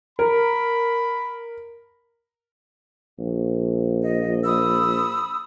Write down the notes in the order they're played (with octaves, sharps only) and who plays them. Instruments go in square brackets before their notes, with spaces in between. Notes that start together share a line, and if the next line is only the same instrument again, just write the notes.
[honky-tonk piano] A#4 [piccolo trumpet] B5
[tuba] A#1
[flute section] D#5
B5 D#6 E6